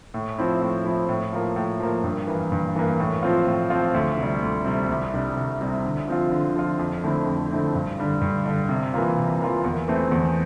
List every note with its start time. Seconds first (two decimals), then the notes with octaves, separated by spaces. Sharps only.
0.14 A2
0.38 F3 C4 E4
0.61 A2
0.85 F3 C4 E4
1.09 A2
1.33 F3 A#3
1.56 A2
1.80 F3 A#3
2.03 G2
2.27 E3 A#3
2.52 G2
2.76 E3 A#3
3.00 A2
3.23 F3 C4 F4
3.47 A2
3.70 F3 C4 F4
3.94 D2
4.17 C3
4.23 G3
4.42 D2
4.65 C3 G3
4.89 C2
5.14 C3 G3 D4
5.37 C2
5.61 C3 G3 D4
5.85 D3
6.08 F3 C4 F4
6.32 D3
6.56 F3 C4 F4
6.79 F2
7.04 D3 A3 C4 E4
7.27 F2
7.51 D3 A3 C4 E4
7.75 G2
7.98 D3 G3 D4
8.21 G2
8.46 D3 G3 D4
8.69 C3
8.94 E3 A#3 F4
9.17 C3
9.40 E3 A#3 F4
9.64 E2
9.88 E3 A3 C4
10.12 E2